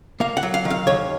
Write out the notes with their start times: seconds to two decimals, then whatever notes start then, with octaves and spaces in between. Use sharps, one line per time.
0.20 A#3 F5
0.37 F#5
0.43 F#3
0.54 F5
0.65 D#3
0.70 F5
0.87 D#2 C#5